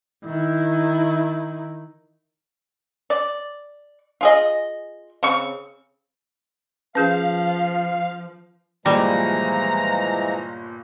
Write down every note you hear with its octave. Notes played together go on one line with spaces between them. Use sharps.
D#3 E4
D5
F4 G#4 D#5
C#3 C4 C#6
F3 C#4 G#4 B4 F5 G6
G1 A#2 E3 F3 G3 G#3 A#5